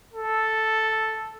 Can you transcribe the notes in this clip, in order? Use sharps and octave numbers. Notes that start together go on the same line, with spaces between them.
A4